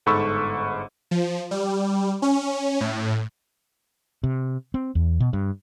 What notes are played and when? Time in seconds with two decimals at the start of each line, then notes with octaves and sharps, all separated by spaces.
0.06 G1 G#2 A4 B5 C#6 E6
1.11 F3
1.51 G3
2.22 C#4
2.81 A2
4.24 C3
4.74 C4
4.95 E2
5.20 B2
5.33 G2